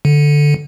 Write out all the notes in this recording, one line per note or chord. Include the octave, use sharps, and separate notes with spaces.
D3